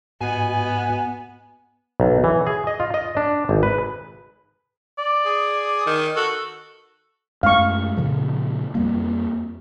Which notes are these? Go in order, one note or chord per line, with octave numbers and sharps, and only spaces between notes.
G#2 B3 F#4 D#5 G#5
B1
E3
G#4
D#5
F4
D#5
D4
G#1
B4
D5
G#4
D#3
F#4 A4
F#2 G#3 A3 F5 C#6
A#2 C#3 F3
F2 G3 A#3